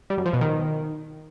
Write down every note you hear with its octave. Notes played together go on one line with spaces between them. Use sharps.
G3
F#2
F3
B2
D#3